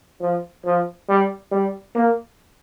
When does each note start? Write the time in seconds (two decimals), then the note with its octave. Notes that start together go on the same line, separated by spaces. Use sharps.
0.20 F3
0.65 F3
1.09 G3
1.51 G3
1.95 A#3